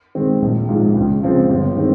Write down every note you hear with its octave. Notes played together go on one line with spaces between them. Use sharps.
D#3 G#3 C4
A#1
G#2 F3 G#3
C#2
C#3 F3 G#3 C4
G1
D#3 G#3 C4